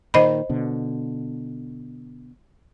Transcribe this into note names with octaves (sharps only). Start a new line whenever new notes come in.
A#2 D#3 C5 D#5 B5
B2 D3